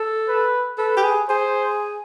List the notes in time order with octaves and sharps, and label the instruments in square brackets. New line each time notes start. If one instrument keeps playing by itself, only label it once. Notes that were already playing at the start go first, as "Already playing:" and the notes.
Already playing: [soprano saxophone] A4
[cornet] B4
[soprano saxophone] A4 [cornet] B4
[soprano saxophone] G4
G#4
[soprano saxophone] G#4 [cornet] C5